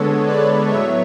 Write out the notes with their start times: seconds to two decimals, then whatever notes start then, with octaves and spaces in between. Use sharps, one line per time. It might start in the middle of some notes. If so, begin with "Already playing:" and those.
Already playing: D3 G#3 B3 A4 C#5
0.26 B4 D5
0.69 A2 F#3 B3 C#5 E5